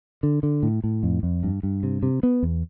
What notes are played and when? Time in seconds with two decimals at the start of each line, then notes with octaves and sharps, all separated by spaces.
0.23 D3
0.43 D3
0.63 A2
0.84 A2
1.03 F2
1.23 F2
1.43 G2
1.63 G2
1.83 C3
2.03 C3
2.23 B3
2.43 E2